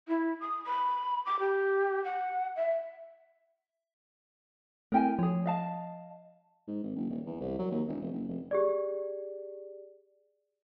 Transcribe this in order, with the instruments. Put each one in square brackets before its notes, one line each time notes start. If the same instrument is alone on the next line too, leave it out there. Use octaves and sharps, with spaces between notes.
[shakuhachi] E4
D#6
B5
D6
G4
F#5
E5
[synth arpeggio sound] A3 C4 E4 [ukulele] A#4 G5 G#5
[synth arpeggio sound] F3 [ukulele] G#4 C#5
[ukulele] D#5 F5 A5
[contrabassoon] G#2
G#1
F#1
D#1
E2
C2
F#3
D#2
E1
F1
F#1
F1
[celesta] G4 G#4 D5